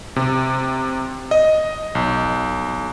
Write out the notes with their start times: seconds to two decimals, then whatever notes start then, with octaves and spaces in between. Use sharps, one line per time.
0.16 C3
1.31 D#5
1.95 B1